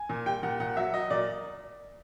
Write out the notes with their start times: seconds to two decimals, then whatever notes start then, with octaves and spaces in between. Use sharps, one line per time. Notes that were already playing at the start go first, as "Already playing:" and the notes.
Already playing: G#5
0.09 A#2
0.26 G3 G5
0.43 A#2 F#5
0.60 A#2 F#5
0.77 F#3 E5
0.94 F#3 D#5
1.10 A#2 D5